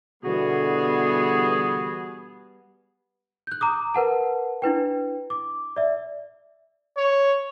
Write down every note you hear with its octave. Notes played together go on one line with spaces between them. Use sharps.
B2 D3 E3 G3 B3 F#4 G#4
F#6 G6
A#5 D6 D#6
A#4 B4 F#5 A5
D4 E4 B4 G5
D6
D5 E5
C#5